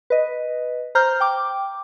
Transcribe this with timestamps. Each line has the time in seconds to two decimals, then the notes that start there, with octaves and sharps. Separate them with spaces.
0.10 B4 D#5
0.95 C5 A#5 F6 G6
1.20 G5 D6